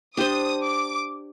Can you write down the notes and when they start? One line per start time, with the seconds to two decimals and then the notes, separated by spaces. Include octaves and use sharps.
0.17 D4 G4 C5 D#6
0.64 D6